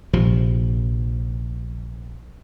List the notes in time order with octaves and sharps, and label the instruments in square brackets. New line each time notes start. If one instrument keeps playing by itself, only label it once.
[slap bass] A#1 C3 F3